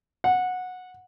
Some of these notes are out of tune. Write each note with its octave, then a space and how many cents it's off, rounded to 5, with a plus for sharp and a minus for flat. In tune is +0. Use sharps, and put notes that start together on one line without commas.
F#5 -15